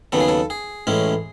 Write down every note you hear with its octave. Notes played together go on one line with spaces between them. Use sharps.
D#2 C#3 F#3 B3 A4
G#4
A4
G#4
A1 A2 G#3 C#4 E4